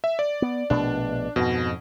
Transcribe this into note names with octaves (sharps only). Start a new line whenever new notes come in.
E5
D5
B3
A#1 B2 A3 D4
F2 G#2 B2